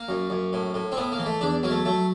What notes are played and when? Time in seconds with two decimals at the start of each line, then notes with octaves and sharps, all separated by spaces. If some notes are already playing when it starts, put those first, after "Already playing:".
Already playing: A#3
0.09 F#2
0.30 F#2
0.53 A2
0.74 A2
0.92 C4
0.97 A2 B3
1.12 A#3
1.19 E3
1.26 A3
1.41 E2 D4
1.63 F#3 A#3
1.70 A3
1.85 F#3 A3